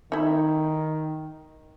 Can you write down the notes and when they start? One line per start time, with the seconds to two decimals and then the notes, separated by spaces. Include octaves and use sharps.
0.12 D#3 D#4 E4